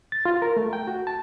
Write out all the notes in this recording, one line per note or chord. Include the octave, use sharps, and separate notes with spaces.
A6
F4
A#4
A3
G5
F#4
A5